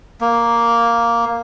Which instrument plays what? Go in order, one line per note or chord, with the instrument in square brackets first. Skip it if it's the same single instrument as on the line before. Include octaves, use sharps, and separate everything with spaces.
[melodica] A#3